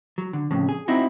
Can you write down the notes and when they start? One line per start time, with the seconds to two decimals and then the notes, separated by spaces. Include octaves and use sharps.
0.18 F#3
0.33 D3
0.51 F2 A2 C#3
0.69 G#4
0.88 C4 D#4 E4 F#4